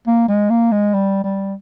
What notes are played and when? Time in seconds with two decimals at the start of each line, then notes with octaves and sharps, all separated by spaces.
0.07 A#3
0.29 G#3
0.50 A#3
0.72 G#3
0.94 G3
1.24 G3